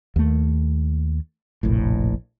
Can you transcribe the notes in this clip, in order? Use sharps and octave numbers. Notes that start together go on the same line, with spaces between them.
D#2 A3
F1 A#1 A2